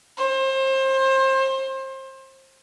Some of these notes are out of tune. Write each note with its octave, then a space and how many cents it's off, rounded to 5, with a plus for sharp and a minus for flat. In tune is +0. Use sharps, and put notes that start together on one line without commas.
C5 +30